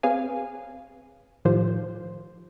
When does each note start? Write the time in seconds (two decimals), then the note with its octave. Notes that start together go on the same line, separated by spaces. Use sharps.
0.03 C4 G#4 B4 C#5 F5 G#5
1.45 A2 D#3 F3 F4 G4 C5